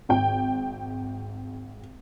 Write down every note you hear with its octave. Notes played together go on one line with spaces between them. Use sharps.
G#1 G5